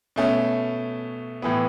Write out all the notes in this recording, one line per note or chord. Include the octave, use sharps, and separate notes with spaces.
B2 A3 C#4
A2 E3 B3